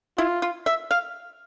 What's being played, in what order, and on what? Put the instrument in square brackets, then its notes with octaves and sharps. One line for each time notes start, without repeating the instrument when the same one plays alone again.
[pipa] E4 [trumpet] F4
[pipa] F4
E5
F5